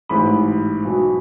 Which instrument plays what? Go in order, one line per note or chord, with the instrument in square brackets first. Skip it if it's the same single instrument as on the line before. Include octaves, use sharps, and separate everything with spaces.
[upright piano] A1 G#2 E3 B5
B1 B2